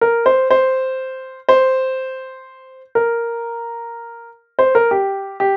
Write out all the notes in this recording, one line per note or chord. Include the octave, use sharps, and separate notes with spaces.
A#4
C5
C5
C5
A#4
C5
A#4
G4
G4